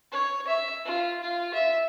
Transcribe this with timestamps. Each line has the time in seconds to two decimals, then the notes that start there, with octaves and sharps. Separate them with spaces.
0.12 C#5
0.47 E5
0.85 F4
1.20 F4
1.54 E5